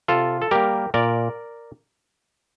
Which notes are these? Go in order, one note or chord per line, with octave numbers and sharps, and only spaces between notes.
C3 F4 A4
A4
G3 A#3 G4 A#4
A#2 A#4 D5